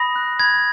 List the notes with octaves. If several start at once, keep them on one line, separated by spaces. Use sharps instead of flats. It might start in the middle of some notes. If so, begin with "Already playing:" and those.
Already playing: B5 D#6 A#6
F#6
B5 G#6